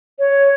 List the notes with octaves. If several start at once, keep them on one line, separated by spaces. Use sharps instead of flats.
C#5